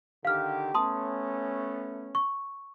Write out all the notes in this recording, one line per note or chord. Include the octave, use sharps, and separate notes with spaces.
D3 D#3 G4 F5 F6
A3 B3 C#4 A5 C6 D#6
C#6